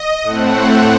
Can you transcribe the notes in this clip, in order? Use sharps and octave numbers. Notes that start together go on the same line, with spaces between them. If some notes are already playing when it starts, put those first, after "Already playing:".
Already playing: D#5
A2 A3 C4 F#5